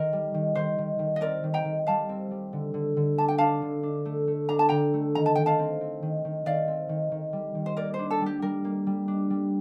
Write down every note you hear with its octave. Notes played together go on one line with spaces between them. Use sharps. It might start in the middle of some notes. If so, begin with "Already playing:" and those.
Already playing: D#3 A#4
G3
D#3
D#3 C5
D#3
D#3
D#5
C4 A#4 D5
D#3
G5 A#5
D#3
G3 F5 A5
C4
G3
D3
D3
D3
D4 A5
G5
D4 F5 A5
D3
D4
A3
A3
D4 A#5
A5
D3 G5 A#5
A3
D#3 A#5
A5
D#3 G5
F5 A5
C4
C4
D#3
D#3
D#3 D5 F5
C4
D#3
D#3
G3
D#3
C5
A#3 A#4 D5
C5
D4
A4
G3
G4
G3 A#4
A#3
G3
D4
G3